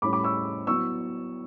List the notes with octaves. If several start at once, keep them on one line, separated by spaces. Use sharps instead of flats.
A2 G3 C#4 E4 B5 D6
B5 D6
C#6 E6
F#3 B3 E4 C#6 E6